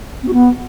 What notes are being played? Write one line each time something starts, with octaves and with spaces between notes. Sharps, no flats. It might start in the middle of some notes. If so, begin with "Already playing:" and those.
C4
F#4
B3